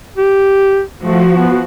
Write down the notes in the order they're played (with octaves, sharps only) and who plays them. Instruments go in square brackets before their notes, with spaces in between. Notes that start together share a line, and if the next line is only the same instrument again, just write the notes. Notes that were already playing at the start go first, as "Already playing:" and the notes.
[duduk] G4
[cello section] F3 F#4 [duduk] A3
[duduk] B3